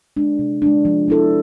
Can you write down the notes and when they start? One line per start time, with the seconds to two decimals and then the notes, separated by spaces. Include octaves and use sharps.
0.17 G#3 D4
0.39 C3
0.62 G#3 D4
0.85 F3
1.08 B3 E4 A4